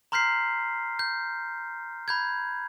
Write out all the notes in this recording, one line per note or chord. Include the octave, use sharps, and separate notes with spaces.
A#5 C6 F6 G6 B6 C7
G6
B5 G6 G#6